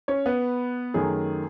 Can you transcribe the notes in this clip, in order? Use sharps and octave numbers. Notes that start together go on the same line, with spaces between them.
C#4 C#5
B3 B4
F#2 D#3 A3 G#4